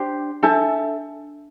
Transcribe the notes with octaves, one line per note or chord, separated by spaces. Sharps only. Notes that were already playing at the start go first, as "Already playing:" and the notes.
Already playing: D4 G4 C5
D4 A4 E5 A5